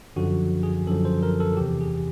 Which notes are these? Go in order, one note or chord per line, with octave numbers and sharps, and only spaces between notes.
F#2 D3 F3 F#4
G#4
F#2 D3 F3 A4
C5
A#4
A4
E2 C3 E3 G4
G#4